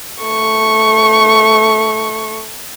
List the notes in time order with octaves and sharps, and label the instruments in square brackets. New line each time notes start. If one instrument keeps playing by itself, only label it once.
[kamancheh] A3 C#6